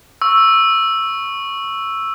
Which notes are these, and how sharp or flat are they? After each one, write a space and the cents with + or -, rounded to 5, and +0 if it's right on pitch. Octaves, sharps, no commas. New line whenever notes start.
C#6 +0 E6 +0